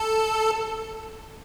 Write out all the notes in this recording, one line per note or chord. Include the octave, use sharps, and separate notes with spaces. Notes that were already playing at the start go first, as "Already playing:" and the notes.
Already playing: A4